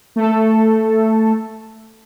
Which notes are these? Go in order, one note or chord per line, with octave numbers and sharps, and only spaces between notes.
A3 A4